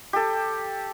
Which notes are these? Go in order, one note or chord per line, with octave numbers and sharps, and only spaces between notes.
G4 A4